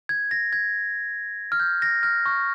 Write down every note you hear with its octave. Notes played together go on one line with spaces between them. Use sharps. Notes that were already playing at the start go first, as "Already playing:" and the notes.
G#6
A#6
G#6
F6
G6
A#6
F6
C#6